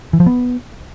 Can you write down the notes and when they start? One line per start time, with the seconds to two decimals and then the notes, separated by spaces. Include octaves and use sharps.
0.13 E3
0.20 F3
0.26 B3